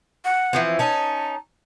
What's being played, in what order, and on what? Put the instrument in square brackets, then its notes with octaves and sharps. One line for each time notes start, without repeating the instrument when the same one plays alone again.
[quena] F#5
[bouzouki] E3 F3 C4
[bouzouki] C#4 D#4 [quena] A5